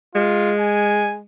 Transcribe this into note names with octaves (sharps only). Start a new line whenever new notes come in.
G#3 F4
G#5